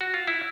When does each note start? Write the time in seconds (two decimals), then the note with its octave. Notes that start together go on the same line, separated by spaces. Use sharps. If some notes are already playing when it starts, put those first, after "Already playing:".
0.01 F#4
0.14 F4
0.27 E4